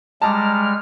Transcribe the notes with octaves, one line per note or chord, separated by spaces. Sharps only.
G3 G#3 A5 A#5 D6 F6